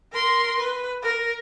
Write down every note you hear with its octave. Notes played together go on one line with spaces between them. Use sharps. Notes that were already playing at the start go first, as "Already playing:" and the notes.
A#4 C6
B4
A#4